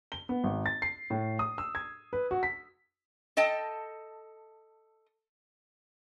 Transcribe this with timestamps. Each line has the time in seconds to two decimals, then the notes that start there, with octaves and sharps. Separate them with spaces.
0.12 G7
0.29 B3
0.44 G#1
0.66 A6
0.82 C7
1.10 A2
1.39 D#6
1.58 E6
1.75 G#6
2.13 B4
2.31 F#4
2.43 B6
3.37 A4 D#5 G5 A5